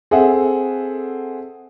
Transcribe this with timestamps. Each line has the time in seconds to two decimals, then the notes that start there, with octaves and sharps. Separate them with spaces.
0.11 C4 G#4 A4 E5 F#5